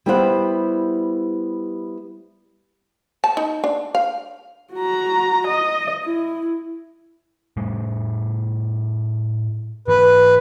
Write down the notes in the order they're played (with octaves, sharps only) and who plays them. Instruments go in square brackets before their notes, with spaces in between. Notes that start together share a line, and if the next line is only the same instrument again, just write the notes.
[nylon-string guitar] G3 B3 E4 G4 C5 F#5
[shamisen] A5
D#4
D4
F5
[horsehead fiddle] F#4 A#5
D#5
E4
[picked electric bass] A2 G3 A3
[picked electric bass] G#2 E3 [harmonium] B4